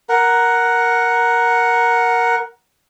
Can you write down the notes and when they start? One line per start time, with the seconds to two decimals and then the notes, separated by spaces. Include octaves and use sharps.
0.09 A#4 F#5